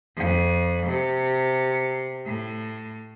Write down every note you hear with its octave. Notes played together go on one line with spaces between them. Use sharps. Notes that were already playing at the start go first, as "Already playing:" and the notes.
F2
C3
A2